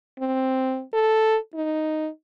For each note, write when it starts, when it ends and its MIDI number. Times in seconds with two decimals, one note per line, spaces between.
0.19 0.82 60
0.93 1.37 69
1.55 2.09 63